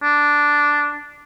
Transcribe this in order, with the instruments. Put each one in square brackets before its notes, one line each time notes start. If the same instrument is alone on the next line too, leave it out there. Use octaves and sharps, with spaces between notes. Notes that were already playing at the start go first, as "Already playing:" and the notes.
[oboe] D4